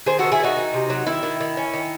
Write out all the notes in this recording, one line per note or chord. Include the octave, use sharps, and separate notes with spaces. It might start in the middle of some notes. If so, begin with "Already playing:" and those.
D#3 G#4 C5
D#3 F#4 A4
E4 G#4
D#3 D#4 F#4
D#3
C3
F#3
D#3 E4
D#3
D#3
C#4
D#3